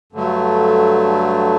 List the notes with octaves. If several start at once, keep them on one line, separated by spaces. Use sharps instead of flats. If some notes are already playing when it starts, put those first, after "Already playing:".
G2 D3 F#3 A3